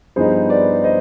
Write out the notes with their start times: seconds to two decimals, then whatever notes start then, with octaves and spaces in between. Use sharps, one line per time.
0.16 G2 F3 B3 D#4 G#4 C5
0.50 B4 D5
0.84 C5 D#5